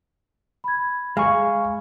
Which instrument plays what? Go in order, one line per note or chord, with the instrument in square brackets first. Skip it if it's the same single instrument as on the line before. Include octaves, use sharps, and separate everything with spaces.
[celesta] B5 G#6
[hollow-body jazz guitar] G#3 [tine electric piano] F5 G#5 C#6